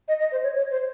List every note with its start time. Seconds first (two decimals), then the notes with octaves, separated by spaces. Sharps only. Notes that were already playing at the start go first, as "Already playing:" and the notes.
0.08 D#5
0.20 D#5
0.32 C5
0.43 C#5
0.55 C#5
0.71 C5